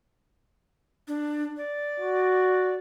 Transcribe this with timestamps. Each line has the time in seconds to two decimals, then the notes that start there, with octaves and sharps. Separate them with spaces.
1.08 D4
1.57 D5
2.00 F#4